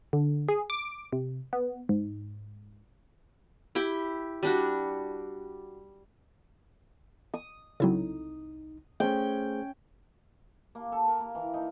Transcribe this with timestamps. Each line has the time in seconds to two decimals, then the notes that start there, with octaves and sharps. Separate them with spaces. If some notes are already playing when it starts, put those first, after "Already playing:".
0.13 D3
0.49 G#4
0.70 D6
1.13 C3
1.53 B3
1.89 G#2
3.75 E4 G4 G5
4.43 G3 D4 F#4
7.34 D#6
7.80 C2 C#3 F#3 C4 D#4 E4 A4
9.00 A3 C#4 G#4 C5 G5
10.75 A#3
10.92 A4
11.08 A#4
11.20 A#3
11.35 E3
11.54 D#4